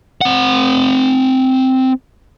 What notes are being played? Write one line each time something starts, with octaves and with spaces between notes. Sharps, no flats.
C4 F#5